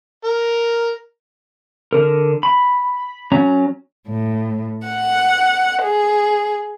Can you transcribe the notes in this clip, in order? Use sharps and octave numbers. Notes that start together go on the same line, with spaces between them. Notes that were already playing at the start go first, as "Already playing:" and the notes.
A#4
D3 A#4
B5
F#3 C#4 A#5
A2
F#5
G#4